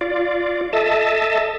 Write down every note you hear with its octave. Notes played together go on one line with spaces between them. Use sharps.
F4 D5
A4 D#5 E5 A5